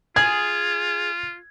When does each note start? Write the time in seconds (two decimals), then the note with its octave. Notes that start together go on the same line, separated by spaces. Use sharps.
0.16 F4 G#4 G#6